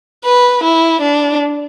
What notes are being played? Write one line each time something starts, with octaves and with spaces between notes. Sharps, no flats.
B4
E4
D4